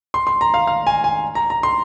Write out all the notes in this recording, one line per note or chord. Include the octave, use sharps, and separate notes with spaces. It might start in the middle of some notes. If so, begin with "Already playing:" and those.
C6
C6
A#5
F5
F5
G#5
G#5
A#5
A#5
C6